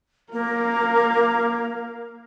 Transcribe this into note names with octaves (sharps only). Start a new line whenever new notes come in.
A#3 A#4 F5